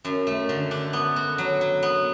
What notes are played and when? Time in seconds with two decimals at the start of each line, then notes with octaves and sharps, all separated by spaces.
0.05 F#2
0.27 A3
0.49 D3
0.71 D4
0.93 B3
1.16 F#4
1.38 F#3
1.61 F#3
1.83 B3